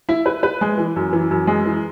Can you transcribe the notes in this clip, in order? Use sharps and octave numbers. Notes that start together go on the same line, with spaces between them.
E4
B4
B4
G#3
E3
F#2
E3
F#2
G#3
E3